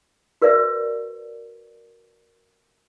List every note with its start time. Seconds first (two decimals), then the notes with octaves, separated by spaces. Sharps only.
0.42 F#4 A#4 B4 D5 E5